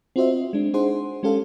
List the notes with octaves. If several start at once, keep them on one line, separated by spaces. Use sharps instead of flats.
C4 F4 F#4 C5 D#5 E5
G#3 D4
D4 D#4 G#4 C5 F#5 C6
G#3 C#4 G4 A4 F5